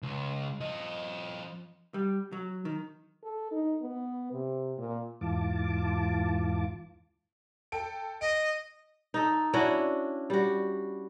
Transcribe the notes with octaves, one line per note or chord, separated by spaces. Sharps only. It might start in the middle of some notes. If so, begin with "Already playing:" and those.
C#2
F3 D#5
G3
F#3
D#3
A4
D#4
B3
C3
A#2
E2 G#2 E3 F4 A5 D6
A4 G5 D7
D#5 D7
D#4 A4
C#4 D4 E4 F#4
G3 F#4